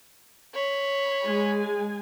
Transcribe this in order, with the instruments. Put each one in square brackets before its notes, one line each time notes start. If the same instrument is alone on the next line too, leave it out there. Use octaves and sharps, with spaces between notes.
[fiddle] C#5 B5
[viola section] G#3 G#4 G#5